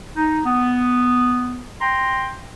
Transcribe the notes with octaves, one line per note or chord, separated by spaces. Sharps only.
D#4
B3
G5 A#5 C6